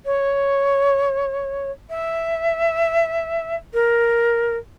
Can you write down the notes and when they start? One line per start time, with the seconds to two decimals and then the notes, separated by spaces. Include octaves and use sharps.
0.06 C#5
1.90 E5
3.74 A#4